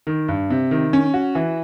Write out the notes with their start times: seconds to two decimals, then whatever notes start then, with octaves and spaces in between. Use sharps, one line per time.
0.07 D#3
0.28 G2
0.50 C3
0.71 D#3
0.93 C#4
1.14 F#4
1.35 E3